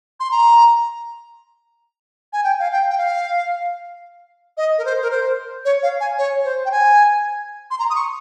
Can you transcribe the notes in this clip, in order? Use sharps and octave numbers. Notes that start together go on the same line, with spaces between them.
C6
A#5
G#5
G5
F5
G5
G5
F5
D#5
A#4
C5
A#4
C5
C#5
F5
G#5
C#5
C5
G5
G#5
C6
A#5
D#6
C#6